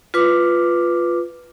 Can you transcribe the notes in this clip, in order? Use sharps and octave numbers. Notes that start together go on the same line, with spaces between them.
F4 B4 D6